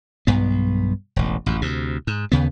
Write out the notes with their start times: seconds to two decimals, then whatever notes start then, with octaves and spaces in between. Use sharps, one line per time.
0.27 B1 G2 B3
1.16 E1 A1
1.46 A1 F#2
1.62 D2 C3
2.07 G#2
2.32 D#2 C#3 B3